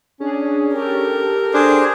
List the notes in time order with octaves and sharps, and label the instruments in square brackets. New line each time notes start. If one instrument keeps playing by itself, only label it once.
[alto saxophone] C#4 [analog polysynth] D4 G#4
[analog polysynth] G4 A4 [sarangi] A#4
[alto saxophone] D4 [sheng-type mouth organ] G#4 C5